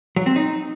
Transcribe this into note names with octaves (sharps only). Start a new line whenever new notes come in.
F#3
C4
D#4